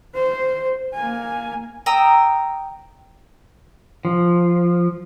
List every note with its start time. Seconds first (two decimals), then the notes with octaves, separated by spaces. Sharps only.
0.15 C5
0.94 A#3 G#5
1.86 G5 A#5 D#6 E6
4.05 F3